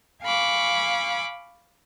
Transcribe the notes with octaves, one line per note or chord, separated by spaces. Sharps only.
F5 G#5 B5 C#6 D6